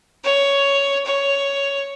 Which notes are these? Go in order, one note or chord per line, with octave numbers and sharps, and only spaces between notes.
C#5
C#5